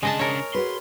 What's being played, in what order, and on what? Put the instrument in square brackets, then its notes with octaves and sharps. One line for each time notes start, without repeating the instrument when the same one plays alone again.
[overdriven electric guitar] C#3 D4 [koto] G#3 D#5 A5
[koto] A#4 C#5
[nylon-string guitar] F#4 G#4 B4 [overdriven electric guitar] C6